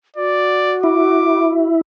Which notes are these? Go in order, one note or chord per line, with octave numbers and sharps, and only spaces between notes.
F#4 D5
E4 D6